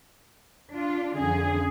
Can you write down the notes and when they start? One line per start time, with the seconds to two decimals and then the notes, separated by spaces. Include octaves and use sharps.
0.71 D4 F4
1.16 F2 D3 C#4 G#4